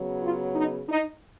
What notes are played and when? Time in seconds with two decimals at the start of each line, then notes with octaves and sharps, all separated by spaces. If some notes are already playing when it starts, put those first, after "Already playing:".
Already playing: C#3 F#3 B3
0.23 F4
0.55 D#4
0.89 D#4